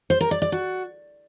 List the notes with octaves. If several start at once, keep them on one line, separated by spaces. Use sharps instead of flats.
C5
A#4
D5
D5
F#4